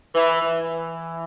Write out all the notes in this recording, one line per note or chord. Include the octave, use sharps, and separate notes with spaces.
E3
E3